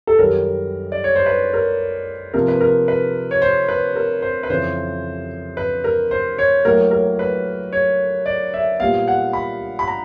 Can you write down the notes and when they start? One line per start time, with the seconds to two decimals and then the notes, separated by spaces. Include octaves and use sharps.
0.07 A4
0.19 F#2 D#3 G3 A#4
0.92 D5
1.04 C#5
1.16 C5
1.26 B4
1.54 A#4
2.34 C3 F3 A#3 A#4
2.48 B4
2.61 A#4
2.88 B4
3.31 C#5
3.42 C5
3.68 B4
3.96 A#4
4.22 C5
4.43 B4
4.50 F2 C#3 E3 C5
5.57 B4
5.84 A#4
6.11 C5
6.38 C#5
6.65 A2 F#3 A#3 A#4
6.91 A#4
7.19 B4
7.73 C#5
8.26 D5
8.54 E5
8.80 A#2 G3 B3 F5
9.08 F#5
9.33 B5
9.79 B5
9.88 A#5